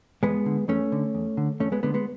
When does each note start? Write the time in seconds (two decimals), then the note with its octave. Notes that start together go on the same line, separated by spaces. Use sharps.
0.23 E2 G#3 B3
0.46 D3
0.69 E2 A3 C#4
0.92 D3
1.15 E2
1.37 D3
1.60 E2 A3 C#4
1.72 G#3 B3
1.83 D3 G#3 B3
1.94 G#3 B3